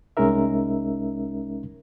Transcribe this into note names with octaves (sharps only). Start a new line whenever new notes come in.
C2 G#3 C#4 D#4 A#4 E5